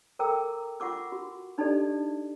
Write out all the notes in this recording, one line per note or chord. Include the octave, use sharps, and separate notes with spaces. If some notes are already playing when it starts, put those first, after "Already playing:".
A4 A#4 G5 A#5 D6 E6
F4 F#5 C#6 D6 E6
F#4
D4 D#4 G4 A4 D5 D#5